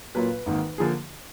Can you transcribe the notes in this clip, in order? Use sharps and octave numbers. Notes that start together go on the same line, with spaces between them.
A#2 F#3 A#3 F4 B4
G#1 G#2 D#3 A#3
D3 F3 A#3 G#4